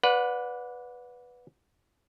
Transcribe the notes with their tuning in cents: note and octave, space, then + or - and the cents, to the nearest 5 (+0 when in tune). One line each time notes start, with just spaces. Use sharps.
B4 +0 D5 -15 F#5 -30